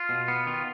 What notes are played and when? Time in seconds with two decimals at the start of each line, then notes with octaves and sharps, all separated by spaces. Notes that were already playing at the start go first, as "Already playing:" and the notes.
Already playing: F4
0.09 B2
0.28 B3
0.47 D#3 F4